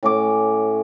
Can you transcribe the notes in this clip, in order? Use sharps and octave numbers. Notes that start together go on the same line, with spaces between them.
A2 C#4 D6